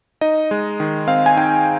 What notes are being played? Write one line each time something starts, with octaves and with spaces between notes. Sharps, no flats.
D#4 D#5
G#3
D#3
C4 F5
G#5
D#4 G5